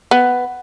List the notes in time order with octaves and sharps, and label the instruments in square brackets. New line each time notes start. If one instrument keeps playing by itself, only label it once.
[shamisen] B3